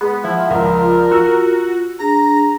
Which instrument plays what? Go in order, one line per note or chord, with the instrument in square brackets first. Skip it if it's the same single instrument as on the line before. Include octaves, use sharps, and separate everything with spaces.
[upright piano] G#3 [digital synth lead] B3
[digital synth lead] F3 [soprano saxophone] E4 [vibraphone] F#5
[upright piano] C#2 [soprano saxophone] A#4 [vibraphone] D5 F5
[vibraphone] F4
[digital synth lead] F#4 [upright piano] E6
[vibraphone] D4 G#4 [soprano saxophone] A#5 [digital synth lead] A#6